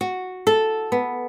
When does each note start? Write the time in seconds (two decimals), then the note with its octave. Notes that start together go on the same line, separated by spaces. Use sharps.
0.01 F#4
0.47 A4
0.92 B3